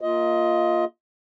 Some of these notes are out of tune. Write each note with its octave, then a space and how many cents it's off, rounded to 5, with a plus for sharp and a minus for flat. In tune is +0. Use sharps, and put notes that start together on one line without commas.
A#3 +0 F4 +0 D#5 +20